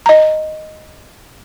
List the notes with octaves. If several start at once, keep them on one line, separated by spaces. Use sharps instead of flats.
D#5 A#5